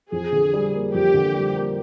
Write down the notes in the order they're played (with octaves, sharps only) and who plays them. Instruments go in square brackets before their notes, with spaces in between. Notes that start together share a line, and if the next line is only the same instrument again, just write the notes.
[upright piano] F2 [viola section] G#4
[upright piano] D3
G3
A#3
[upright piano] F2 [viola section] G4
[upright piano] D3
G3
A#3